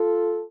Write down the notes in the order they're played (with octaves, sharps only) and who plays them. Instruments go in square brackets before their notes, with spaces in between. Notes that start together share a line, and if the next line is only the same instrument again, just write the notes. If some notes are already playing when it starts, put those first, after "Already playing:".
Already playing: [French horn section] F4 A4